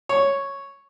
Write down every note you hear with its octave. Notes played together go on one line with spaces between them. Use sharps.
C#5